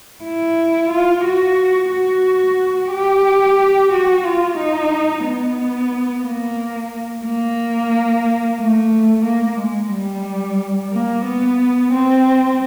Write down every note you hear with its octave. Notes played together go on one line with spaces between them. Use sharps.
E4
F4
F#4
F#4
G4
F#4
F4
D#4
B3
A#3
A#3
A3
A#3
G#3
G3
A#3
B3
C4